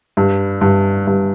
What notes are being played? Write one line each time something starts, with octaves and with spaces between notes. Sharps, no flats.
G2
G2
G2